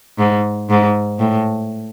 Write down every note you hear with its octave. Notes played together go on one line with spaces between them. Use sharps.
G#2
G#2
A2